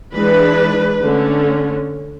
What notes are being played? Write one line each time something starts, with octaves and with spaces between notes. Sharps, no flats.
E3 G#3 D4 B4
D3 A3 C#4